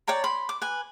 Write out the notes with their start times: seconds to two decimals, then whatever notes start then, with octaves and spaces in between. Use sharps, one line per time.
0.07 C#5 D5 G5 A#5
0.24 B5 C6
0.49 D6
0.62 B4 G#5